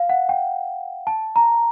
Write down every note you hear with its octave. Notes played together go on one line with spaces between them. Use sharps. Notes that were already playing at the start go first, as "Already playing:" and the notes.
Already playing: F5
F#5
G5
A5
A#5